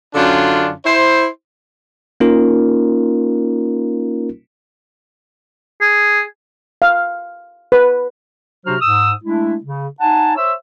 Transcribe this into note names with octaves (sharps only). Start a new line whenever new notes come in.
F#2 D3 C#4 D4 F4
E4 C5
A#3 C#4 D#4 F4 A#4
G#4
F5
B4
C3 F#3 D4 F#4 C5 F6
G#2 D#6 E6
G#3 A3 D4 E4
C#3
D#4 F#5 G#5 A5
C5 C#5 E5 E6